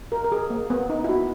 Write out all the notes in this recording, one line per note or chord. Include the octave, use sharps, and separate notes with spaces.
A#4
A#4
G#4
A#3
B3
D#4
E4
F#4